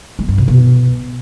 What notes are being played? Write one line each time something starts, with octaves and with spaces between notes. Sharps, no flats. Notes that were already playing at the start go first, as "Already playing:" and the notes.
G#3
G2
C3
B2